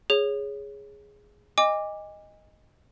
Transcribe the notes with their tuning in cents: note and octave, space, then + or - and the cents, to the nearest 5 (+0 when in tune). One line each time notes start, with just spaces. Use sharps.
G#4 +0 C#5 +0
D#5 +0 G#5 -35 D6 +0